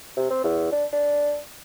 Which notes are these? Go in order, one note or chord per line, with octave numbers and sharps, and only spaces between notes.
C3
C4
E2
D4
D4